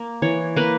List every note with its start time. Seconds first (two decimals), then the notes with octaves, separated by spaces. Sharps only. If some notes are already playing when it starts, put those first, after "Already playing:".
Already playing: A#3
0.22 E3 C#5
0.56 A#3 B4